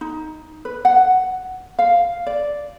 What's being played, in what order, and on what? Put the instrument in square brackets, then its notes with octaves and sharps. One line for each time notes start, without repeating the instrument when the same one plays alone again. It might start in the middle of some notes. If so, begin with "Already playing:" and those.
[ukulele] D#4
B4
F#5
F5
D5